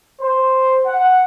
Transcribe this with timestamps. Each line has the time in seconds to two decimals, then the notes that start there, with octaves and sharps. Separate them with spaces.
0.22 C5
0.86 F#5